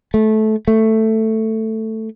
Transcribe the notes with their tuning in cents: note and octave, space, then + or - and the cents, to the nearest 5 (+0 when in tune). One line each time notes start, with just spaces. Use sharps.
A3 -20
A3 +5